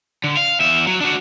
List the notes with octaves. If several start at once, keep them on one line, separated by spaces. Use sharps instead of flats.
D3
F5
E2 E5
F#3
D4 F#4